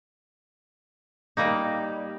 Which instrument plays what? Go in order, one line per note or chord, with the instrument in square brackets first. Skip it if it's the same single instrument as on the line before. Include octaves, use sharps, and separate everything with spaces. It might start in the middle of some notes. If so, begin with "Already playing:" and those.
[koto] G3 A#3 D#4